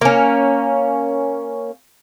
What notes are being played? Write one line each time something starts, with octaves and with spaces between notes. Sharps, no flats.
A#3 C#4